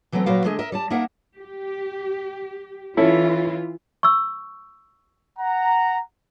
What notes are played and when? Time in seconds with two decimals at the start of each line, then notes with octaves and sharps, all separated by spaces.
0.12 E3 F#3 A3 B3 C4
0.26 A#2 F#3 F#4 A#4 B4 F5
0.44 D3 G#3 A3 G#4 D#5
0.59 A#4 D#5 E5
0.72 G3 D5 A5
0.90 A#3 D#4 A#4 E5 F#5
1.36 G4
2.97 E3 C#4 E4 F4 A4
4.03 C#6 E6
5.39 F#5 A#5